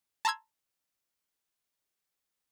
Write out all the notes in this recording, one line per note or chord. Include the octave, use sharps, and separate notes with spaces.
A5 A#5 C6 E6 G#6